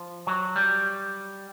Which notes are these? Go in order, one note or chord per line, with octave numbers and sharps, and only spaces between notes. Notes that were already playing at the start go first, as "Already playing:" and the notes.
Already playing: F3
F#3
G3